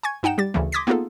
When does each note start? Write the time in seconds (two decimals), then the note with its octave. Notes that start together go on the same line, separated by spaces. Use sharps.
0.03 G#5 C#6 G#6
0.23 G2 D#4 F#5 G5 E7
0.38 G3 G4 A6
0.54 D2 C#3 E3 A3
0.72 C6 D6 D#6 G#6 A#6 B6
0.87 A#3 B3 D#4 F4 G#4 A4